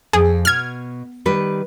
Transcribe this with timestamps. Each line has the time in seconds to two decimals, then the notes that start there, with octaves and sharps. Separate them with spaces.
0.13 F2 G#4
0.45 B2 F6 G#6
1.25 D#3 G3 B4